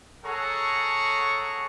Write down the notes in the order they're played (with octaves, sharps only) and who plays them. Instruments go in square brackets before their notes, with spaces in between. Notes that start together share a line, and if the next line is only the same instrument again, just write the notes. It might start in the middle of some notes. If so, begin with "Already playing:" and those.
[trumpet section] G#4 A4 C#5 F#5 A#5 C#6